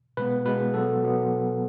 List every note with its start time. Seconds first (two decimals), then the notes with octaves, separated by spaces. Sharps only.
0.17 B2 G#3 B3 B4
0.45 B2 G#3 B3 B4
0.74 B2 F#3 B3 A4
1.03 B2 F#3 B3